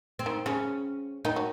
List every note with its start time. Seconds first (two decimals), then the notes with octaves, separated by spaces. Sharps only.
0.19 C4
0.26 D#3
0.46 C#3 C#4
1.25 D#3 D#4
1.36 F#3